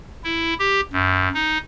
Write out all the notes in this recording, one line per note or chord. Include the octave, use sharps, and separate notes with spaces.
E4
G4
F#2
D#4